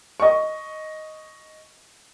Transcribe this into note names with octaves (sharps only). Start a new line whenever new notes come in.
D#5 C#6